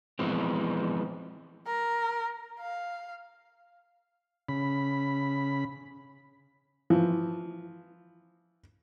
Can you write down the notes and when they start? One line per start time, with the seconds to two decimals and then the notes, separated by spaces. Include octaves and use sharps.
0.19 E3 F3 G#3 B3 C4
1.67 A#4
2.60 F5
4.49 C#3 B5
6.90 E3 F3